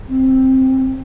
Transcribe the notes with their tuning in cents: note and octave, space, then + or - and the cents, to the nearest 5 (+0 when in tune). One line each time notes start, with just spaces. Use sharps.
C4 +5